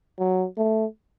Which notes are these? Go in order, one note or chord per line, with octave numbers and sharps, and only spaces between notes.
F#3
A3